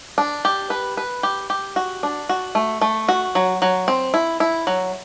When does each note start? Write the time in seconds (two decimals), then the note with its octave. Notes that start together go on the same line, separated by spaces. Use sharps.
0.18 D4
0.45 G4
0.70 B4
0.97 B4
1.23 G4
1.50 G4
1.76 F#4
2.03 D4
2.29 F#4
2.55 A3
2.81 A3
3.08 F#4
3.35 F#3
3.62 F#3
3.88 C4
4.14 E4
4.40 E4
4.67 F#3